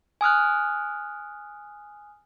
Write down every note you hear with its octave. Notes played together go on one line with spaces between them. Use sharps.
G#5 D#6 F6 F#6